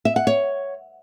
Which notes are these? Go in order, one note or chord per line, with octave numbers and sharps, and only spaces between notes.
E5
F#5
C#5